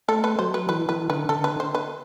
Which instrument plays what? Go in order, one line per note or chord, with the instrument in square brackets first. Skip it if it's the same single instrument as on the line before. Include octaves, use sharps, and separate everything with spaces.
[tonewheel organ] A3 [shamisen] A4
[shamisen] B4
[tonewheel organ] F#3 [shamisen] C5
[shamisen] B4
[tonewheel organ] E3 [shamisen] B4
[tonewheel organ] E3 [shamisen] B4
[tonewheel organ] D3 [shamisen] B4
[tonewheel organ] D3 [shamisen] A4
[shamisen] B4
C5
B4